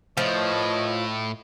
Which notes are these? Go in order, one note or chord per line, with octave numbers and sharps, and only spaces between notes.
A2 F3 B4 C#5 D#5